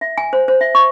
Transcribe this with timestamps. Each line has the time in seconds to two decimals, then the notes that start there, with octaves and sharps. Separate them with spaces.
0.01 E5
0.18 G#5
0.33 C5
0.48 C5
0.61 E5
0.75 C#6